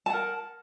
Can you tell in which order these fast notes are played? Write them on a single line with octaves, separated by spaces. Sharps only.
A5 F#5 A#4